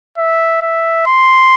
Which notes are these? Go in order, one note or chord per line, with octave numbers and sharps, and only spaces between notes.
E5
E5
C6